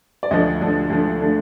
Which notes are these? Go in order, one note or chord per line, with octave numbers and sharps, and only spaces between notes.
D5
D2 D3 F3 A3 D#5
D2 D3 F3 A3
D2 D3 F3 A3
D3 F3 A3